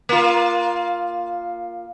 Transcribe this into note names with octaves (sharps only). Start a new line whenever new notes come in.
A#3 F4